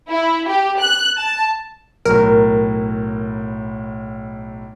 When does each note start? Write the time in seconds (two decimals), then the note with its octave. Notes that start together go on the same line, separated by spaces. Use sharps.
0.10 E4
0.48 G4
0.80 F#6
1.17 A5
2.05 B1 A2 A#4